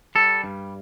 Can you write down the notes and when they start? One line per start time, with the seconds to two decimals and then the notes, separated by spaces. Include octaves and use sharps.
0.15 G3 A4
0.44 G2